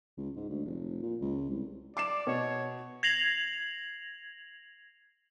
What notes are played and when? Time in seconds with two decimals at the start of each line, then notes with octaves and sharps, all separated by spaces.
0.17 C#2
0.36 G#2
0.49 D2
0.66 F1
1.02 A#2
1.21 C#2
1.50 C2
1.97 D5 D6 C7 E7
2.27 B2 C#5
3.03 G#6 A#6 C7 F7 F#7